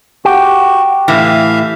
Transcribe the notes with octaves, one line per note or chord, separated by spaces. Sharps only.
F#4 G4
A2 E3 E5 F5